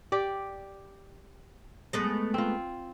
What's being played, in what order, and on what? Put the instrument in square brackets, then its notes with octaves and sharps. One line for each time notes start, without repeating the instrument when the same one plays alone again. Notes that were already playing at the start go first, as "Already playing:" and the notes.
[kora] G4 D5
[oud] G#3 A3 B3
[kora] C4 F4